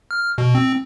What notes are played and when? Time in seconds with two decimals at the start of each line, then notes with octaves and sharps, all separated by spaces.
0.11 F6
0.38 B2
0.55 C4